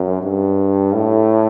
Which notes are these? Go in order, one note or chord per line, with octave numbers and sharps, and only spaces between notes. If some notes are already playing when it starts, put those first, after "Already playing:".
Already playing: F#2
G2
A2